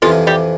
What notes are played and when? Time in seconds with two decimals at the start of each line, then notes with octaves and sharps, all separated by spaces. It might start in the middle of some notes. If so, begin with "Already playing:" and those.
0.02 F2 C3 E3 F3 F4
0.27 G3 G4